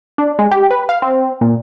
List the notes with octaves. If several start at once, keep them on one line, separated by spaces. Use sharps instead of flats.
D4
G#3
G4
B4
F5
C4
A#2